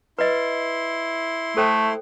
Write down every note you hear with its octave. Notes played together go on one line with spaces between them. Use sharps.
E4 B4 D#5 C6
A3 A4 C5 G5